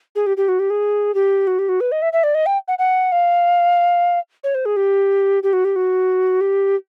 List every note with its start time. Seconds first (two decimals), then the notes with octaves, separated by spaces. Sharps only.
0.16 G#4
0.26 G4
0.37 G4
0.48 F#4
0.59 G4
0.70 G#4
1.14 G4
1.47 F#4
1.59 G4
1.69 F#4
1.80 B4
1.92 D#5
2.02 E5
2.13 E5
2.23 D5
2.35 D#5
2.46 G5
2.68 F#5
2.79 F#5
3.12 F5
4.44 C#5
4.55 C5
4.65 G#4
4.76 G4
5.43 G4
5.53 F#4
5.65 G4
5.76 F#4
6.41 G4